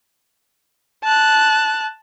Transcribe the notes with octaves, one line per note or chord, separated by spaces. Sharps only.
A5 F#6